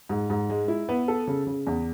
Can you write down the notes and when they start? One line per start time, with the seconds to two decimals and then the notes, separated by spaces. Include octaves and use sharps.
0.09 G#2
0.30 G#2
0.49 G#3
0.68 E4
0.89 B3
1.08 A4
1.27 C#3
1.47 C#3
1.67 E2